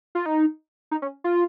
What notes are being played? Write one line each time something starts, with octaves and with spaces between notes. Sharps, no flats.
F4
D#4
D#4
C#4
F4